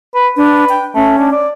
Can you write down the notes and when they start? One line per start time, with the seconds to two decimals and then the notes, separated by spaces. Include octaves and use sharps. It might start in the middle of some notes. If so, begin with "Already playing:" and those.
0.14 B4
0.37 D4 B4
0.69 G5
0.95 A3 C#4
1.18 D4
1.32 D5